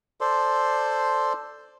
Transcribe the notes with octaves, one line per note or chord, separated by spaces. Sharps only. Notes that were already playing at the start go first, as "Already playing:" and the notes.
A4 C5 D5 C6